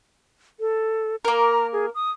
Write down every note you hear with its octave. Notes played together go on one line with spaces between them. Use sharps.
A4
A#3 A#4 A#5
G#4
D#6